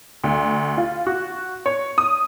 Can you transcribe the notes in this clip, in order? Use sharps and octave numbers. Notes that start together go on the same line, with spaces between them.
D2
F4
F#4
C#5
D#6